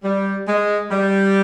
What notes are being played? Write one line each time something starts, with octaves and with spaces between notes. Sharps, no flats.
G3
G#3
G3